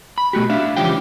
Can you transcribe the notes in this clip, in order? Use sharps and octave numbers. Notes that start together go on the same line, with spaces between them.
B5
B2 A3 F#4 G4
D4 E5 F5
C#2 E3 F3 C#4 G4 G5